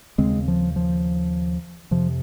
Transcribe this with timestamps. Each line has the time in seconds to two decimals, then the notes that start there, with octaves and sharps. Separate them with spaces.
0.18 D#2 C#3 G#3 C4
0.48 F3
0.76 F3
1.91 F2 C3 F3